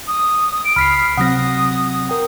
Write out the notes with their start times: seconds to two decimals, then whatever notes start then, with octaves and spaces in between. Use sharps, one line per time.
0.08 D#6
0.65 D7
0.76 C#2 B5 F6 B6 C7
1.17 C3 F#3 C4 F#5 D#6 A#6
2.09 A#4 G5